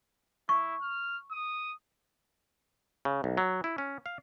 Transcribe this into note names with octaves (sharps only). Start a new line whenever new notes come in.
E4 C#6
F6
D#6
C#3
B1
F#3
E4
C#4
F5